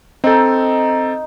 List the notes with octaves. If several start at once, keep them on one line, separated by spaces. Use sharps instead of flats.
C4 D#4 A4